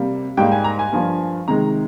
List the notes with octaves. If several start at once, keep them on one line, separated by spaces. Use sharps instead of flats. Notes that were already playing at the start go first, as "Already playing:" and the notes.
Already playing: C3 G3 A#3
G#2 G3 A#3 G5
G#5
A#5
G#5
G2 F3 A#3
C3 D#3 G#3 A#5